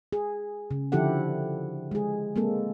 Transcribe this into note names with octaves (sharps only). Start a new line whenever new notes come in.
G#4
C#3
D3 F3 E4 G4 A4 F#5
G#3 G#4
G#3 A#3 C4 A4